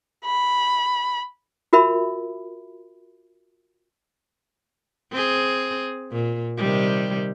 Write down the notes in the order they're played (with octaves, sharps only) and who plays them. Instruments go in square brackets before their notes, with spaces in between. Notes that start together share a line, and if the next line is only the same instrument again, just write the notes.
[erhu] B5
[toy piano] F4 F#4 A#4 E5 B5
[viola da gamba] C4 G#4
A#2
C3 D#3 G3